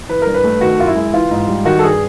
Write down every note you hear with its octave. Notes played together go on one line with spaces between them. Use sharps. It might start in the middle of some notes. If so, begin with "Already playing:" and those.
E3 B4
G2 A#4
B4
A3
D#3 F#4
F#2 F4
E4
G#3
E3 F4
G#2
G3
D#3 F#4
A4
G2 G#4